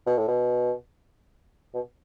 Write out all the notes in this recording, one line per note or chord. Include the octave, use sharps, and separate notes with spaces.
B2
A2
B2
B2